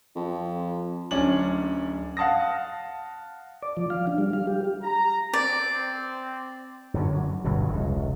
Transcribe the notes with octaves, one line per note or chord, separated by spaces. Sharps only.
F2
D1 C#4 D4 F#7
F5 F#5 A5 D#6 A#6
D5
F3
F5
D4
G3
F5
G4
A#5
C4 D5
F#2 D3 F#3
G1 G2 B2 F#3
F1 C#2